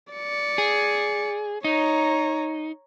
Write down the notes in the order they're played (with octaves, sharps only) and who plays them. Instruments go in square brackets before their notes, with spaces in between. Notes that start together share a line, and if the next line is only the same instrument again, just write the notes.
[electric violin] D5 C#7
[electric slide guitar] G#4
[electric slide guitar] D#4 [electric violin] C#5 A#5